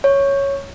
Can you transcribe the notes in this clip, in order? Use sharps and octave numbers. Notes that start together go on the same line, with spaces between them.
C#5